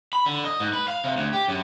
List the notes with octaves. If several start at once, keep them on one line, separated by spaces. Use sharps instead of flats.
B5
D3
D#5
G#2
B4
F5
C3
D2
G4
F#2